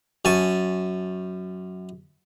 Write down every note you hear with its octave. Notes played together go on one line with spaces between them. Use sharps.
F#2 G#5 A5 C#6